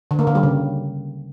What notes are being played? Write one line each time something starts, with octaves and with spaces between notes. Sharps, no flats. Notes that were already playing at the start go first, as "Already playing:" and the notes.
D3
A#3
D3
G3
C#3